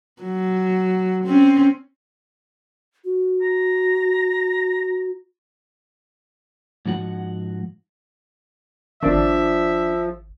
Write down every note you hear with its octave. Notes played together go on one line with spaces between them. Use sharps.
F#3
C4 C#4
F#4
A#5
G#2 F3 F#4 F#5
G#1 F3 D4 D5 E5